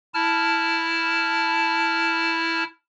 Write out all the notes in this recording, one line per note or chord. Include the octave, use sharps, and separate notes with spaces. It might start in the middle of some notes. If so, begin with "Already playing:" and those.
E4 A5 F6